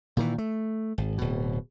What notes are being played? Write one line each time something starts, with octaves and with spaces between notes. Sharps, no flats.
A#2 D#3 E3
A3
G#1
D1 B2